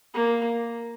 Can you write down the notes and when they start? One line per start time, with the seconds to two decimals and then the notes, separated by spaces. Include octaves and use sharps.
0.14 A#3